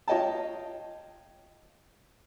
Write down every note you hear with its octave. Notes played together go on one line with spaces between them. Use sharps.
F4 C#5 D#5 G5 A5